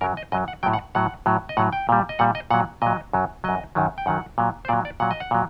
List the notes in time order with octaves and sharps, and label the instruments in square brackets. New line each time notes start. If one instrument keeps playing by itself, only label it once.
[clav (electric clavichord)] F#2 F#3 A#4
D#5
F#2 F#3 D#5
F#5
A2 F#3 G5
F#5
A2 F#3 F#5
A2 F#3
D#5
A2 F#3 F#5
G5
A#2 G3
D#5
A#2 G3 F#5
D#5
A#2 F#3 F#5
A#2 F#3 D#5
F#2 F#3
F#2 F#3 D#5
F#2 D#3 F#3
G5
F#2 D#3 F#3 F#5
A#2 F#3
C5
A#2 F#3 D5
D5
A#2 F#3 F#5
D#5
F#5
A#2 F#3